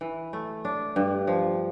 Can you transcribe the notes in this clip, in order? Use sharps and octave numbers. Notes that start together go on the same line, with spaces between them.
E3
A3
D4
G2
F3